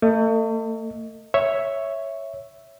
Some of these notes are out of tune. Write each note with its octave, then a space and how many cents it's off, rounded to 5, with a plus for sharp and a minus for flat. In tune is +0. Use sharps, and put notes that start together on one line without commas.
A3 +40 D#5 +0
C#5 +0 E5 +0